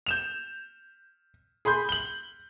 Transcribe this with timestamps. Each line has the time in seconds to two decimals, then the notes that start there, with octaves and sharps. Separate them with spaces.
0.07 G6 E7 F7
1.65 G#4 B5 C6 G6
1.89 F#7 G7